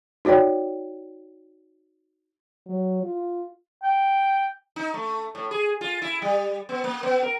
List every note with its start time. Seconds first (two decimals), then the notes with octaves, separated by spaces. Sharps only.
0.25 D#4 F#4 C#5 D5 G5
2.66 F#3
3.03 F4
3.83 G5
4.76 D#4
4.94 A3
5.35 A2
5.51 G#4
5.81 F4
6.02 E4
6.22 G3
6.69 B3
6.84 A#3
7.03 B3
7.22 A#4